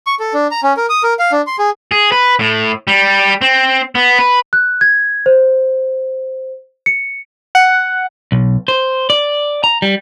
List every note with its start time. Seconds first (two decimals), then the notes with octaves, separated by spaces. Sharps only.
0.07 C#6
0.20 A4
0.34 D4
0.51 A#5
0.63 C#4
0.77 A#4
0.89 D#6
1.03 A#4
1.19 F5
1.32 D4
1.47 C6
1.59 G#4
1.92 G#4
2.12 B4
2.39 A2
2.87 G3
3.41 C4
3.95 B3
4.19 B4
4.53 F#6
4.81 G#6
5.26 C5
6.86 C#7
7.55 F#5
8.32 B1
8.68 C5
9.10 D5
9.64 A#5
9.82 G3